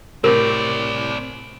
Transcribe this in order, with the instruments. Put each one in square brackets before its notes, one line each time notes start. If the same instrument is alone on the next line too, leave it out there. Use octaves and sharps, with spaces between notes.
[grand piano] A2 C3 [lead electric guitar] C4 D5 [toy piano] A#4